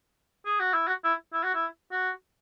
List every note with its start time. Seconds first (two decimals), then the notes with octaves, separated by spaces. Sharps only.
0.46 G#4
0.60 F#4
0.74 E4
0.88 F#4
1.04 E4
1.33 E4
1.44 F#4
1.54 E4
1.92 F#4